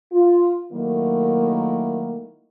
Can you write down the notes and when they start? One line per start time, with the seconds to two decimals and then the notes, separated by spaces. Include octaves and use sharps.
0.13 F4
0.73 D#3 F#3 A3 A#3 E4